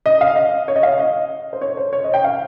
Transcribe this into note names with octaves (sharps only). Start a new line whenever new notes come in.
D#5
F5
D#5
C#5
D#5
F5
D#5
C5
C#5
C5
C#5
D#5
G5
F5